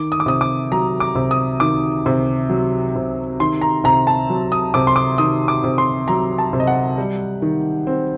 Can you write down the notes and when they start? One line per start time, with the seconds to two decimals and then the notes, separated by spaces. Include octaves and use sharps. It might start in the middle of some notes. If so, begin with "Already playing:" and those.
Already playing: D#3 D6
0.12 D#6
0.20 D6
0.26 C3 D#6
0.41 D6
0.72 F#3 A#5
1.00 D6
1.15 C3
1.31 D#6
1.60 D#3 D6
2.06 C3
2.50 F#3
2.96 C3
3.40 D#3 C6
3.62 A#5
3.84 C3 A#5
4.07 A5
4.30 F#3
4.52 D#6
4.74 C3 D6
4.87 C6
4.96 D6
5.18 D#3 D#6
5.48 D6
5.64 C3
5.78 C6
6.08 F#3 A#5
6.38 A5
6.53 C3
6.60 D#5
6.67 F#5
6.98 G3
7.42 D#3
7.87 C4